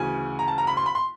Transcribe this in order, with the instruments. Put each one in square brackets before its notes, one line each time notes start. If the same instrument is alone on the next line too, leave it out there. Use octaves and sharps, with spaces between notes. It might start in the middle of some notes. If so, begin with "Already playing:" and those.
Already playing: [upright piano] D2 C#3 E3 G#5
A#5
A5
A#5
B5
C6
B5
C6